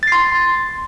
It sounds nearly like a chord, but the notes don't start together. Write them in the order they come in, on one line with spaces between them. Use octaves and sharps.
A6 C7 C6